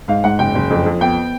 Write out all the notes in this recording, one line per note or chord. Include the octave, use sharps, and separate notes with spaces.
G#2 F5
G#2 F#5
F#1 G5
F#1
F2
F2
B3 G5